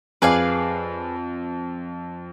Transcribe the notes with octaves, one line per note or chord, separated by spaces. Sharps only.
F2 G#4 B4 D5 F5